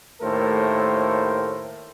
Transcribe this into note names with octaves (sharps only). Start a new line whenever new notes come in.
D#2 A2 A3 A4 A#4 C5